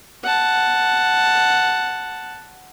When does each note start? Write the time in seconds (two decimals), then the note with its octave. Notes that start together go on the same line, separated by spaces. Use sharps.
0.24 F#5 A5